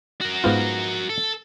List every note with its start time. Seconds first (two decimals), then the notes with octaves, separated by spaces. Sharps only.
0.21 F#4 A#4
0.44 G#2 B3 F4
1.10 A4